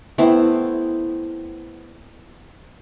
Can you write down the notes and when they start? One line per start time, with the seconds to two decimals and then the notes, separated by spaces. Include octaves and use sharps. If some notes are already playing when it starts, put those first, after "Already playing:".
0.18 A3 B3 C4 E4